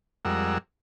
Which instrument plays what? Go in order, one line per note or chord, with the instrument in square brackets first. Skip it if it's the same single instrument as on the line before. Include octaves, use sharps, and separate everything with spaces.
[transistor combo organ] F2 G3 G#3 A#4 F#5 E6